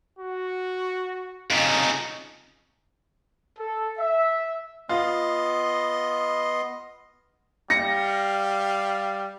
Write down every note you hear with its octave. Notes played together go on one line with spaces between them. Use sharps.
F#4
F2 C#3 D#4
A4
E5
B3 F4 D#5 C6
G3 F5 A#6 C#7